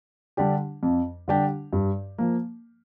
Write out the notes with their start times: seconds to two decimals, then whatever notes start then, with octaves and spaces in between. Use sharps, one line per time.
0.37 D3 G3 D4 G4
0.83 F2
1.28 D3 G3 D4 G4
1.73 G2
2.18 F3 A#3